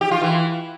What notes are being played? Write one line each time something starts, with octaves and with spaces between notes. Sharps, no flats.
G4
F4
E3